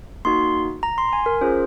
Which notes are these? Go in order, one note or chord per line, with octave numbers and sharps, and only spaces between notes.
A#3 D#4 F#4 C6
A#5
C6
G#5
A#4
C#4 F4 G#4 C5